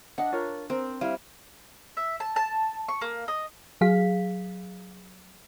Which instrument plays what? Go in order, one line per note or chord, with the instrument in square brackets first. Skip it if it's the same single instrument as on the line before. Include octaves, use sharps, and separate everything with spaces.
[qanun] D4 [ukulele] D#5 F#5
[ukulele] F4 A#4 C#5
[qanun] C4 [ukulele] A#4
[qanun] G3 [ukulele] E4 E5 F5
[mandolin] E5
A5
A5
C#6
A#3
D#5
[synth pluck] F#3 G#4 F5 B6